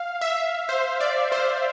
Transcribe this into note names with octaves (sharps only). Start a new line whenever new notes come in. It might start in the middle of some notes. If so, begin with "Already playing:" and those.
Already playing: F5
E5
C5
D5
C5